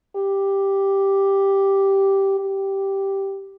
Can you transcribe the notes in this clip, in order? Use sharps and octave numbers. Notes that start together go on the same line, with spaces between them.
G4
G4